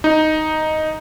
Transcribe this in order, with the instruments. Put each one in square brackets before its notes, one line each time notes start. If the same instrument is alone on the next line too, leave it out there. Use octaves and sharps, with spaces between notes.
[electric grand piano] D#4